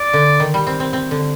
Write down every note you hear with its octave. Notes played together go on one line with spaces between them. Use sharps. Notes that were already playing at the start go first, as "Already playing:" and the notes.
Already playing: D5
D3
D#3
G3
C4
C4
C4
D3